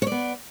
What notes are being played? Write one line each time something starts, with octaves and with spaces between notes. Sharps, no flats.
B3 C#5 D5